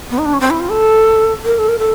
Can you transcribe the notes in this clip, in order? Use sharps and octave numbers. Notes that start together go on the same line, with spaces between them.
B3
D#4
D4
C#4
C4
E4
F4
A4
A#4
A4
A#4
A4